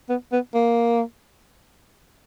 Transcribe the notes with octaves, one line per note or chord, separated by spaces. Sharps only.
B3
B3
A#3